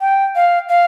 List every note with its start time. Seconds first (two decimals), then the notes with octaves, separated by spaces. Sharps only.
0.01 G5
0.35 F5
0.69 F5